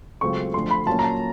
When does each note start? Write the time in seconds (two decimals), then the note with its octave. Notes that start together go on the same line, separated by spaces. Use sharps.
0.21 C#2 C#3 F#3 A3 C4 C#6
0.54 D2 D3 F3 C6
0.71 B5
0.87 A#2 F#3 A#3 C#4 A5
0.99 A#5
1.04 A5